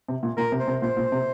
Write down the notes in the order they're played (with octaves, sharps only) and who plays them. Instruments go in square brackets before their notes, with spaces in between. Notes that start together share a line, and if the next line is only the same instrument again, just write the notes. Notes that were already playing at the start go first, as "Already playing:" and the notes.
[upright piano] C3
A#2
[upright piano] A#2 [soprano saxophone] A#4
[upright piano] C3
[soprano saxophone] C5
[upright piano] C3
[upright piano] A#2 [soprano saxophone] C5
[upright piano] A#2
C3